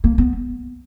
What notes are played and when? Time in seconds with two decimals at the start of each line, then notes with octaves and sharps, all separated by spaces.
0.04 A#3
0.18 B3